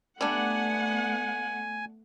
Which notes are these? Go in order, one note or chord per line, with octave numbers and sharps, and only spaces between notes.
G3 A3 B3 D4 F#5 G#5